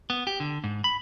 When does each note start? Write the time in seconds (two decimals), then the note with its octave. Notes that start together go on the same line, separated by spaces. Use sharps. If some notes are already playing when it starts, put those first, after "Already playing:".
0.10 B3
0.27 G4
0.40 D3
0.64 G#2
0.84 B5